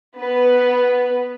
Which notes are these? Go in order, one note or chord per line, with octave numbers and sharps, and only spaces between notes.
B3 B4